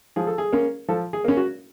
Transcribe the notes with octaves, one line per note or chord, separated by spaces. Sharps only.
F3 G#4
A4
G#4
A#3 C#4
F3 A4
G#4
A#3 C#4
F#4